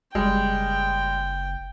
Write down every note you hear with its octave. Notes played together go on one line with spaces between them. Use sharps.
F#1 G3 G#3 G5